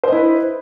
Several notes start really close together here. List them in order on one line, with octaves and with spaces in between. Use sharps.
C5 D#5 E4 B4